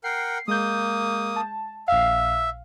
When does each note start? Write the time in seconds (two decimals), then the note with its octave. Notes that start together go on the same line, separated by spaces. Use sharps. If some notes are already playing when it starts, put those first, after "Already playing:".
0.04 A#4 F#5 G5 C7
0.48 G#3 A#3 D#6 G6
1.36 A5
1.88 A#1 E5 F5